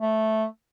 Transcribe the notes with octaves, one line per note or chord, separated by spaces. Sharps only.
A3